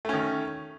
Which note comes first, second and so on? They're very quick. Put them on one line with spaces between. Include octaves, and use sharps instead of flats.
A3 C#4 D#3